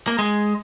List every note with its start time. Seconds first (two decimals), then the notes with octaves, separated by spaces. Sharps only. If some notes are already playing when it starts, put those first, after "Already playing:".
0.08 A#3
0.19 G#3